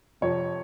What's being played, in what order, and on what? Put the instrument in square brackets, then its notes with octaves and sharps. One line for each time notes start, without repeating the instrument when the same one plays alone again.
[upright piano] F1 F2 F3 C#5